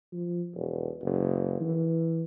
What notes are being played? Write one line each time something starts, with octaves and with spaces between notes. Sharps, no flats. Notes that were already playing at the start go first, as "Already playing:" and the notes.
F3
E1
F#1
E3